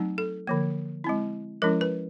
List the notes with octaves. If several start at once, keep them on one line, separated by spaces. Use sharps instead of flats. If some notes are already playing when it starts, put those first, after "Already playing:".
Already playing: F#3 A3 C4 D#4
A4
D3 F3 A#3
G#3 C4 E4
F3 G#3 C#4 E4 A#4
B4